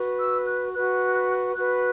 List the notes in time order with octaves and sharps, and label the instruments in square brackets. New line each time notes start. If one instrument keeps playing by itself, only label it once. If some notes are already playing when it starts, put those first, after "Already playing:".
Already playing: [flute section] F#4 B4
E6
F#6
F#4 B4 F#6
F#4 B4 F#6